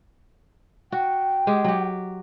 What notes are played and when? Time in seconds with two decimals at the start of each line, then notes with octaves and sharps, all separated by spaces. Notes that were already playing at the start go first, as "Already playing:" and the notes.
0.92 F#4 G5
1.47 G#3 G4 G#4
1.64 F#3 G4